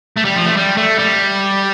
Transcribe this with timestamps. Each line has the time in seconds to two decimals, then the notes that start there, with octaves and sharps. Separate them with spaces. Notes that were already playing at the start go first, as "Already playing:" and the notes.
0.17 A3
0.25 G3
0.36 F3
0.46 A3
0.57 G3
0.78 A3
0.99 G3